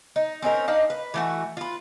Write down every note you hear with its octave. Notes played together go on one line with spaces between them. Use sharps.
D#4
C4 C#4 D#4 A#4
D4 D#4 F5
B4
E3 A3 F#4
F4 B4